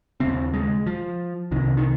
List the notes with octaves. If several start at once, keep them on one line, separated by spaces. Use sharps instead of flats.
D#2 C#3 C4
G#3
F3
C2 C3 D#3
D#3